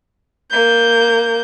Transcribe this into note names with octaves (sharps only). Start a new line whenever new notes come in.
A#3 G6